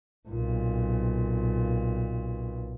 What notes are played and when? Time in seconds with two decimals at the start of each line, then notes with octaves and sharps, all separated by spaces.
0.29 B1 A#2